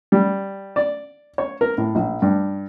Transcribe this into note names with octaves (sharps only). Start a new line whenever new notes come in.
G3
D5
C#5
A#4
A2
A#1
G2